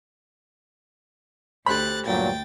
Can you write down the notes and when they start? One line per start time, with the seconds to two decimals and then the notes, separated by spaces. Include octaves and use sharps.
1.66 D2 G4 A4 C5 B5 F#6 A6
2.06 D2 G2 A#2 F#3 G5 A6